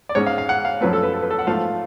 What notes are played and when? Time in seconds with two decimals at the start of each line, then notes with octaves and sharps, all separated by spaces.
0.09 D5
0.15 G#2 G#3 C#4 C#5
0.26 F5
0.38 F5
0.49 F#5
0.65 F5
0.81 F#2 F3 A3 B4
0.93 A4
1.03 B4
1.14 A4
1.22 B4
1.31 A4
1.39 F#5
1.47 G#2 F3 A3 F4 F5